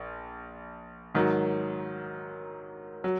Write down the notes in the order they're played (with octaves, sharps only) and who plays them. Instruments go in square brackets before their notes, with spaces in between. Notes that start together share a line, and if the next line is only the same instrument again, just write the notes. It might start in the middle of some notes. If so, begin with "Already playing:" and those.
Already playing: [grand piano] A#1
G#2 D#3 F#3
F#3